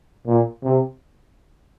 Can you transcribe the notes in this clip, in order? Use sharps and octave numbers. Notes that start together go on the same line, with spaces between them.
A#2
C3